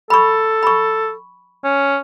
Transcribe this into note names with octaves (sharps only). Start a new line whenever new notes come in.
A4 B5 C#6
B5 C#6
C#4